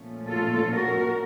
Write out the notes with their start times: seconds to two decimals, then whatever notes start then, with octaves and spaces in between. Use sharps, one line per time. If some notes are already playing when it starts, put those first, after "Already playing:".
Already playing: A#2 F3 A3 C#4
0.28 F4 A4
0.72 F#4 A#4